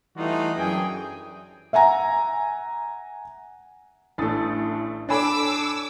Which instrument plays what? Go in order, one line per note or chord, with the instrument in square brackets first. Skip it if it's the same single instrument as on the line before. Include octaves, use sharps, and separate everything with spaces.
[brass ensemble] E3 G3 A3 D#4 F4 F#4
F#2 E3 D4 G#4 G5 G#5
[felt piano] E5 F#5 G#5 A#5
[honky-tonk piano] A1 D#6 A6 [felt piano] A3 D4
[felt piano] D4 G#5 B5 [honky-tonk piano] A4 C#5 [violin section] D6 E6